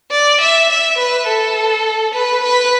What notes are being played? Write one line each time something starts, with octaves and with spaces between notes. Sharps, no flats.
D5
E5
E5
B4
A4
B4
B4